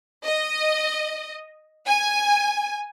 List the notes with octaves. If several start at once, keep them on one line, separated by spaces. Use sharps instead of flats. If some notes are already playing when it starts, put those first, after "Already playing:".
D#5
G#5